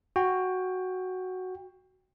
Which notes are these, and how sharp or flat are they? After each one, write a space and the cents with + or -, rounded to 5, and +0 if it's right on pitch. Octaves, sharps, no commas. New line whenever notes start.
F#4 +0 G5 +20